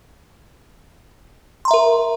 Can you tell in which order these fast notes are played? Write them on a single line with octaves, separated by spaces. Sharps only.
C6 A#5 E5 A#4